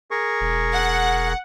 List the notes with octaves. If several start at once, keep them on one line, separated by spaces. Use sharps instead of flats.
G#4 A#4 C#6
E1
F#5